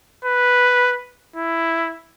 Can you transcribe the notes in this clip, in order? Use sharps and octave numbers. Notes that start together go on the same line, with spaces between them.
B4
E4